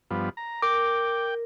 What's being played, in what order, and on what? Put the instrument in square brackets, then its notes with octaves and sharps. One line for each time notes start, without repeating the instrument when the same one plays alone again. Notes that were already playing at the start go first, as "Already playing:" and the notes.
[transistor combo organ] G2 F3 B3
A#5
[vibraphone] A#4 [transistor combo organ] G5 [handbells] D6